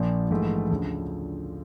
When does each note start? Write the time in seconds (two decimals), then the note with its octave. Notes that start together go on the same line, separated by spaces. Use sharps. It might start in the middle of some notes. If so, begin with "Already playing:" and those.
Already playing: A#1 A#2 F3
0.30 A#1 G#2 E3 A3
0.70 D2 C#3 F3